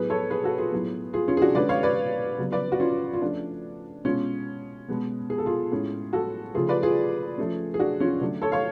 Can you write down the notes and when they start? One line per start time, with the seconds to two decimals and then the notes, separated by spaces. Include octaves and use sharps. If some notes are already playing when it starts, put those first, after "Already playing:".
Already playing: A2 F#3 B3 G#4 B4
0.10 A4 C#5
0.30 G#4 B4
0.44 F#4 A4
0.58 F4 G#4
0.72 A2 F#3 B3
1.13 F4 G#4
1.28 C#4 F4
1.37 G#4
1.42 D4 F#4
1.55 D3 G#3 C#4 B4 D5
1.69 C#5 F5
1.83 B4 D5
2.38 C#3 F#3 B3
2.52 B4 D5
2.72 F#4
2.80 C#4 F4
3.14 F4
3.21 F3 A3 C#4 D4
4.05 B2 G#3 C#4 F4
4.88 B2 G#3 B3
5.30 G#4
5.38 A4
5.46 F4 G#4
5.72 A2 G#3 C#4
6.13 F#4 A4
6.55 C#3 F3 A3 F4 G#4
6.69 B4 D5
6.82 F4 G#4
7.38 F3 A3 C#4
7.74 G#4
7.79 D4 F#4
8.00 C#4 F4
8.21 D3 F#3 A3 D4
8.42 A4 C#5
8.52 C#5 F5